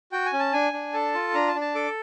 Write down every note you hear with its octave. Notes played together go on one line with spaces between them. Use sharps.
F#4 G5
G#5
C#4
A5
D4 G#5
D4
A4 A5
F4
D4 A#5
A5
D4
A5
A4 D6